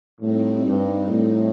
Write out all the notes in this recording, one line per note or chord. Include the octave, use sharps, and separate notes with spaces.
A2 G3 C4 D#4
G2
A2